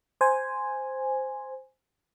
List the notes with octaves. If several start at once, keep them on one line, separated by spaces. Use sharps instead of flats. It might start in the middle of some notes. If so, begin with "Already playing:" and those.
C5 G#5